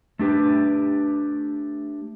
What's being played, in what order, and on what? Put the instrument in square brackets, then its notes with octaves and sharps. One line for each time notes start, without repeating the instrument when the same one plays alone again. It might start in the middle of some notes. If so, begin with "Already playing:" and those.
[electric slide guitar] A3 D4 G4 B4